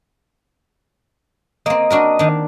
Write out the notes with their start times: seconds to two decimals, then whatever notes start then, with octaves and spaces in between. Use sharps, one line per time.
1.66 A#3 C4 D#5
1.90 D4 F#4 A#4
2.19 D#3 D4